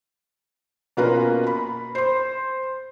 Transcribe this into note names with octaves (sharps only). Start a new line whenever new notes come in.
B2 A#3 C#4 F4 B4 A#5
B5
C5 C6